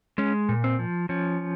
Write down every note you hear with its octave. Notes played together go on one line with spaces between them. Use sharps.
G#3 C#4
A#2
C4
F3
F3 C#4